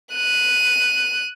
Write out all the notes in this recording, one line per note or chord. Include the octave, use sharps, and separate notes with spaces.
F#6 D#7